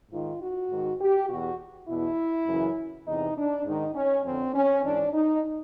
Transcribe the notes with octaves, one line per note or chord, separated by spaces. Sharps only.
G#2 D#3 F4
F#4
G#2 D#3
G4
E2 B2 F#4
E2 B2 E4
F#2 C#3 E3
E2 C3 E3 D#4
D4
G#2 D#3 D#4
C#4
F2 D3 C4
C#4
G#2 E3 D4
D#4